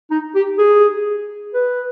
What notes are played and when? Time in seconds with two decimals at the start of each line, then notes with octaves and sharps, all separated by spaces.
0.10 D#4
0.35 G4
0.58 G#4
1.54 B4